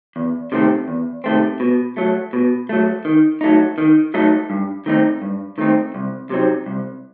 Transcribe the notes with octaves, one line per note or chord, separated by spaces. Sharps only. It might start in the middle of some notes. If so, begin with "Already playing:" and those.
E2
C3 D#3 A3 C4
E2
C3 D#3 A3 C4
B2
F#3 A3
B2
F#3 A3
D#3
F#3 A3 D#4
D#3
F#3 A3 D#4
G2
D#3 A3 C4 D#4
G2
D#3 A3 C4 D#4
C2
C3 F#3 C4 D#4
C2